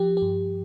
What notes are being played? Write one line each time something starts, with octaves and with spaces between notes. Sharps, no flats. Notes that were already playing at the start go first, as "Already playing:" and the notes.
Already playing: F3 G4
G4
G2